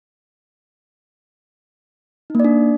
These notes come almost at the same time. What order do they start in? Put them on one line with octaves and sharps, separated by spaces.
D#4 A#3 D5 D4